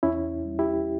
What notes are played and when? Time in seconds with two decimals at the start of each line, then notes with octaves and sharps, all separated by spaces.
0.03 E2 C#4 E4
0.45 G3
0.59 E4 G4